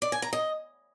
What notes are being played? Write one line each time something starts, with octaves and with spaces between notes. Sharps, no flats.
D5
G#5
A#5
D#5